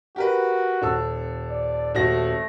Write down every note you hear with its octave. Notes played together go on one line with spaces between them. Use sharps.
F#4 G4 A#4 B4
D#1 A4 E6
D5
D#1 A3 F#4 A#6